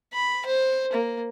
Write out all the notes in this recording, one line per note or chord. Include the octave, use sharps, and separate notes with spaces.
B5
C5
A#3